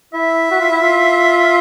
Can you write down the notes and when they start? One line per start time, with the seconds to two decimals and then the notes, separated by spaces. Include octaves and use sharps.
0.14 E4 E5
0.51 F#4
0.60 F4
0.71 E4
0.81 F4